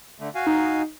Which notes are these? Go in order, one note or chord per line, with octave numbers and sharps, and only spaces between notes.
D3 A3
F#4 F5 G#5
D#4